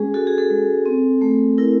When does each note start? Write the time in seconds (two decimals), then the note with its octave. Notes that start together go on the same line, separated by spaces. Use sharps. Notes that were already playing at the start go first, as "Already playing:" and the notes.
Already playing: G#3 C#4 G#4
0.14 F#4 A4
0.27 G#4
0.38 A4
0.50 G#3
0.86 C4
1.21 A3
1.58 E4 A#4